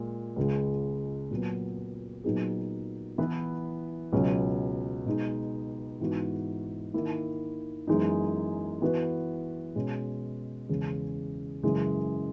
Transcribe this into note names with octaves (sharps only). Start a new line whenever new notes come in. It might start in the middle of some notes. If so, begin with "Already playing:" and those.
Already playing: A#2 G#3
C#2 C#3 G#3
A#2 F#3 B3
A#2 F#3 B3 D#4 G#4
E3 B3 E4 B4
C#2 B2 F#3 C#4
B2 G#3 D#4
G#2 E3 B3 D#4 F#4
D#3 A#3 E4
F#2 E3 G#3 B3 D#4
E3 B3 F#4 B4
B2 G#3 C#4
E2 C#3 G#3
F#2 C#3 E3 G#3